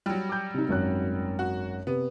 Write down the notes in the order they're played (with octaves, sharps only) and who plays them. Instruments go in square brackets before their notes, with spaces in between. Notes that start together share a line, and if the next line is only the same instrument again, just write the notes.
[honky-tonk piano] F#3 G3
[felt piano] D6 G6
C3 D#4
G#1 F#2 F#6
[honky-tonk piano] F#4
[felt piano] C3 [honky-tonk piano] B3